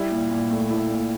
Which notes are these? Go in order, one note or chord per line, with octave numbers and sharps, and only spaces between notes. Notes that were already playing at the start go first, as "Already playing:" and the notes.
Already playing: G3 E4
A#2
A#2
A3
E4
A#2